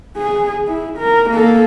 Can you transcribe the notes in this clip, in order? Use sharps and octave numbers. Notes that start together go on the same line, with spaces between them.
G#4
E4
A#4
A#3 A4